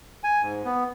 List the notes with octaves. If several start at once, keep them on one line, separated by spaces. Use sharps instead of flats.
G#5
G#2
B3